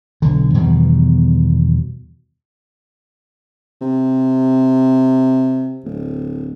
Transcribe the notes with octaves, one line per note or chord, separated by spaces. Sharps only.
B1 D3
E2 B2 D#3 G3
C3
D1